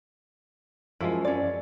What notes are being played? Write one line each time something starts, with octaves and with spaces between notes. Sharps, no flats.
F#2 F3 G#3 E4
C#4 D5